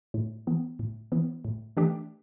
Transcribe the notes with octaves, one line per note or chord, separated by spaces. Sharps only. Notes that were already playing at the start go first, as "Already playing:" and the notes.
A2
E3 B3
A2
E3 B3
A2
E3 A3 D4 G4